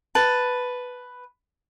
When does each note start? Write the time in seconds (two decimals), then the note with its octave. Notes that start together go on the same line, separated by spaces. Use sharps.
0.15 B4 A5